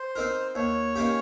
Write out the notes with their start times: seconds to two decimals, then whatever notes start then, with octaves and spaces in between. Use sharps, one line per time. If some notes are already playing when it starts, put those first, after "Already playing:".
Already playing: C5
0.16 C4 D#4 A#4
0.55 D#2 C#5
0.96 D#3 A#3 C#4 G4